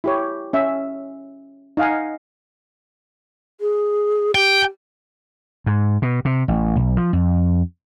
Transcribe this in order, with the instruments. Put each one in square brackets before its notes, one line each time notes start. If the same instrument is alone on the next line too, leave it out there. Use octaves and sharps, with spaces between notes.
[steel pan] E4 G4 C#5
C#4 E5
D#4 D#5 F5 F#5 G#5
[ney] G#4
[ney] G4 [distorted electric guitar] G5
[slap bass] G#2
B2
C3
A1
B1
F3
F2